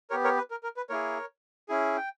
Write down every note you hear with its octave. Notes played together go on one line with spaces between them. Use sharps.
B3 G4 A#4 C#5
A#4 C#5
B4
A#4
A#4
B4
A#3 E4 G#4 A#4 C#5
C#4 E4 G#4
G5